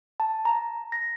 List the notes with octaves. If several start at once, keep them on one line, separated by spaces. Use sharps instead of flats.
A5
A#5
A#6